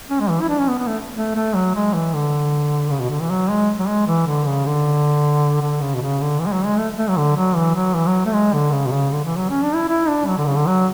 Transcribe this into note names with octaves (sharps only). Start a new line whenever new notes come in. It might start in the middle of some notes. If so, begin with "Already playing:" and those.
C#4
G#3
E3
E4
D4
C#4
B3
B3
A3
A3
A3
F#3
G#3
E3
D3
C#3
B2
D3
E3
F#3
G#3
F#3
G#3
E3
D3
C#3
D3
D3
C#3
B2
C#3
D3
E3
G#3
F#3
G#3
A3
A3
F#3
D3
F#3
E3
F#3
E3
F#3
A3
G#3
D3
C#3
B2
C#3
D3
E3
F#3
C#4
D4
E4
E4
D4
F#3
D3
C#3
D3
F#3